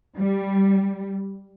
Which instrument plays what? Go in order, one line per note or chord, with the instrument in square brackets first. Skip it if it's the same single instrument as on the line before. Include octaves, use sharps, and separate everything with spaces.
[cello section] G3